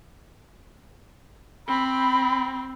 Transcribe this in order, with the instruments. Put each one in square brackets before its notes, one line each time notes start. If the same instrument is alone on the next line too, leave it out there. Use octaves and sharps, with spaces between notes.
[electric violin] C4 [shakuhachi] B5